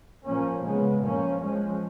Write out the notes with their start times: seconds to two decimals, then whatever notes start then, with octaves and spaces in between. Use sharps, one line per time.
0.23 A#2 F3 A#3 C#4
0.63 C#3 G#3 B3
1.01 A#2 F3 A#3 C#4
1.40 F3 G#3 C#4